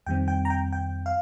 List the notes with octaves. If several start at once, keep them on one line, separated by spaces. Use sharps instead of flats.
F2 D#3 G3 C4 G5
G5
A#5
G5
G5
F5